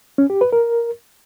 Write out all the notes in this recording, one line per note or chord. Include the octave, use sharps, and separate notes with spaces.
C#4
G4
B4
A#4